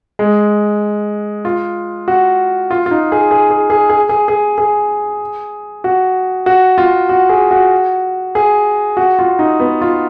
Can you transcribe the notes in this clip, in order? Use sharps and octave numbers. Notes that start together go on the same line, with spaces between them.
G#3
F4
F#4
F4
F4
D#4
G#4
G#4
G#4
G#4
G#4
G#4
G#4
G#4
F#4
F#4
F4
F#4
G#4
F#4
G#4
F#4
F4
D#4
B3
F4